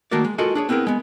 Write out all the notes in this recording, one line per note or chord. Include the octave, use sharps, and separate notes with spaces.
D#3 A3 A#3 F#4 A#4 D5
G#3
F4 F#4 A4 A#4 D#5 G#5
D4 G#4 C#5
B3 C4 E4 G#4 A#4
G#3 B3